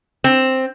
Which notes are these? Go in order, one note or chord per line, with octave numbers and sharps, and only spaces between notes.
C4